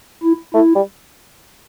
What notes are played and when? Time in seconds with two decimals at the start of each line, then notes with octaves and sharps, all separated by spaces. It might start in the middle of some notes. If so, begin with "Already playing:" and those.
0.23 E4
0.54 A3 E4
0.75 G3